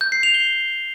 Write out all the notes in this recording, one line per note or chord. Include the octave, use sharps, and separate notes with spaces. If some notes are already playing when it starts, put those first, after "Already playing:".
G6
C7
F7
G7